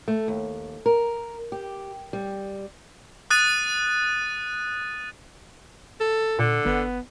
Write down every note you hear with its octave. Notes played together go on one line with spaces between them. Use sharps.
A3
D#2
A#4
G4
G3
D#6 F#6 A6 D#7
A4
A#2 D3
G1 B3